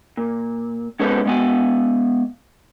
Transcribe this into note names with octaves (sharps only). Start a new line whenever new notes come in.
A#2
G#3 B3 C#4 A4 B4 C5
G#3 B3 G#5